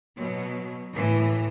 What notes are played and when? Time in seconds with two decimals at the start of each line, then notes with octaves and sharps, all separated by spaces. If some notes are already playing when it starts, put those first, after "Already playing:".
0.16 B2 F#3
0.95 A2 E3